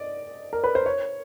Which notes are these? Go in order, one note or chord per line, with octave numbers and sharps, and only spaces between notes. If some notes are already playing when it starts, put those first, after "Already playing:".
Already playing: D5 D#5
A#4
B4
C5
C#5